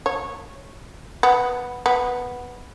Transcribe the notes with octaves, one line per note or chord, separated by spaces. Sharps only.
C#5
B3
B3